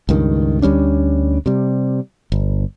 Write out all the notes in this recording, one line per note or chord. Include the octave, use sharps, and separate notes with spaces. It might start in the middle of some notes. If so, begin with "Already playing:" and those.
C#2 G2 D#3
D2 G3 C#4 D4
C3 G3
G1